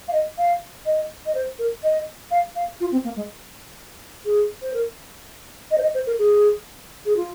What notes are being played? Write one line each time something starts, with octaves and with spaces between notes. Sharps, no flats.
F5
D#5
F5
D#5
D#5
C5
A#4
D#5
F5
F5
F4
C4
A#3
G#3
G#4
C5
A#4
D#5
C5
D#5
C5
A#4
G#4
G#4
F4